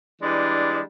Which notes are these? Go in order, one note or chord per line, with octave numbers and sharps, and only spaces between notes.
E3 G3 G#3 D4